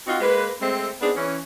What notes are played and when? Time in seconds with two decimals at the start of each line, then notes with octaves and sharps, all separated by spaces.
0.07 C4 D#4 F4 F#4
0.20 G#3 A#3 B4
0.60 G#3 A3 C4
1.01 B3 C4 D4 D#4 G#4
1.16 E3 C#4